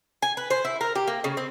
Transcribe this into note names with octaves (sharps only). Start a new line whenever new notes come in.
G#5
B4
C5
E4
A#4
G4
A#3
C#3
C4